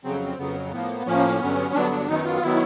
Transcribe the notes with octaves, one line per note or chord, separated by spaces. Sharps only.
F2 C#3 F#3 C4
C4
F2 C#3 F#3 B3
A2 F3 A#3 B3
A2 F3 A#3 C#4
G2 D3 F#3 B3
G2 D3 F#3 B3 D4
D4
F#2 D#3 F#3 B3 D#4
F4
D#3 F#3 B3 E4